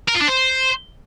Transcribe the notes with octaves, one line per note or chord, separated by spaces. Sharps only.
A#4
F4
D4
C5